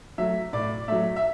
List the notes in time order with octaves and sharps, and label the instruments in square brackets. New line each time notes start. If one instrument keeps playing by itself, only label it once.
[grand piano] F#3 A3 E5
A2 D5
F#3 A3 E5
E5